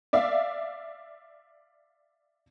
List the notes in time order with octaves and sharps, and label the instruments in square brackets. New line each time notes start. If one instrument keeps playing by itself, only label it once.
[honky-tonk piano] D5 E5 F5